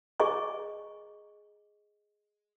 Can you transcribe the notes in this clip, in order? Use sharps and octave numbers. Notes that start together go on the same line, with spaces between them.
G#4 D#5 G#5 C#6